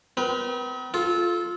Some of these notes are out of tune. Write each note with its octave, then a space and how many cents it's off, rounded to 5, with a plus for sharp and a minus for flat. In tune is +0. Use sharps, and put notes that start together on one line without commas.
C4 -45 B4 -40
F4 +0 A4 -25